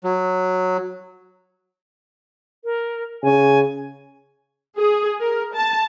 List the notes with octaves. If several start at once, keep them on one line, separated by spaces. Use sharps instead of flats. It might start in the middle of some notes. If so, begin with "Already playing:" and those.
F#3
A#4
C#3 G#5
G#4
A#4
A5